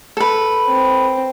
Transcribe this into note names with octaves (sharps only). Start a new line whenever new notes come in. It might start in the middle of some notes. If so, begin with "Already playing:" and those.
A4 B4
C4